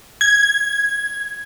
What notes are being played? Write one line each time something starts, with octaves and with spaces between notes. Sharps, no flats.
G#6